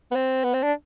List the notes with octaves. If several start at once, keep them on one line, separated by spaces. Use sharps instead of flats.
B3
C4
B3
C4
D4